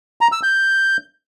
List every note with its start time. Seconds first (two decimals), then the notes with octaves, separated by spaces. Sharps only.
0.21 A#5
0.32 E6
0.43 G6